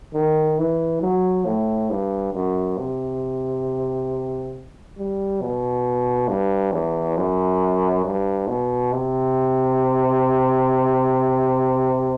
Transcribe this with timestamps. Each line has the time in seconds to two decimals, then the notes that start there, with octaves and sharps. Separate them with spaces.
0.14 D#3
0.59 E3
1.02 F#3
1.46 A2
1.90 G2
2.34 F#2
2.78 C3
4.98 G3
5.42 B2
6.29 G2
6.72 E2
7.17 F#2
8.05 G2
8.49 B2
8.92 C3